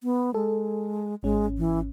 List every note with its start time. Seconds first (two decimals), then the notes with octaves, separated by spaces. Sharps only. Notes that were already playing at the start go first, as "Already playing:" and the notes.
0.03 B3
0.34 G#3 A4
1.23 G#1 G#3 C#4
1.58 E3